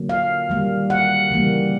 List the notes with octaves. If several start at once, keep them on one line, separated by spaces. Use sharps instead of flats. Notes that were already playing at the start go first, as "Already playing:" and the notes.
Already playing: D3 F#3 A#3
F5
D#3 G3 A#3
F#5
C#3 E3 G3 A#3